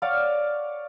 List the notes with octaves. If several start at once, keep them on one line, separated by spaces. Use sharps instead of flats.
C#5 D5 F5 F#5